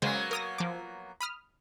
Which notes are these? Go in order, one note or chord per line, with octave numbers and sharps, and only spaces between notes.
C#3 F#3 G#3 A#3 B3 C5
A#4 D#6 A#6
F3 D6
B5 D#6 F6